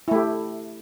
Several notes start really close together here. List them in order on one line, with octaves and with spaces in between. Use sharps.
E4 A3 G4